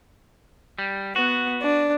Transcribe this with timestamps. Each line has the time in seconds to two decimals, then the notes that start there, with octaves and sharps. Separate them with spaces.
0.79 G3
1.16 B3 F#4
1.62 D4